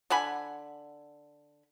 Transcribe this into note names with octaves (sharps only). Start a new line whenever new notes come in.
D3 F#5 G#5 B5